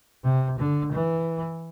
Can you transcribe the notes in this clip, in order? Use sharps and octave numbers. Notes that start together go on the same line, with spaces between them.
C3
D3
E3